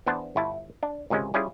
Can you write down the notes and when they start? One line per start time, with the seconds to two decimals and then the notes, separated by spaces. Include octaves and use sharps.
0.06 E2 B3 D4 C5 A5
0.36 G1 E4 A5
0.83 D4
1.10 G#1 C#2 C3 G#3 C#4
1.34 G3 C#4 E4 F4 G#4